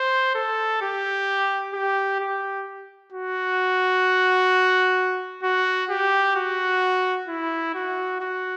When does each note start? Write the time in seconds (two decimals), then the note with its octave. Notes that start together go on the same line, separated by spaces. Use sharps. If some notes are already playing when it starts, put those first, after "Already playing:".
Already playing: C5
0.35 A4
0.82 G4
1.74 G4
2.20 G4
3.12 F#4
5.43 F#4
5.90 G4
6.36 F#4
7.28 E4
7.74 F#4
8.21 F#4